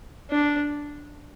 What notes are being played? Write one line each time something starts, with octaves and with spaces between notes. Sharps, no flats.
D4